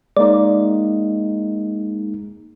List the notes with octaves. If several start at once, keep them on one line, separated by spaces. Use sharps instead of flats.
G#3 A#3 D#4 D5